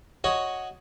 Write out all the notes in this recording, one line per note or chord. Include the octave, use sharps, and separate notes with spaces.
F#4 C#5 D#5